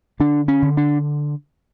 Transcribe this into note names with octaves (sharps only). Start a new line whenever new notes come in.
D3 D4
C#4
D3
D4